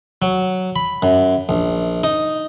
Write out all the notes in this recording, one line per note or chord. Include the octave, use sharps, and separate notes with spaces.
F#3
B5
F#2
A#1
D#4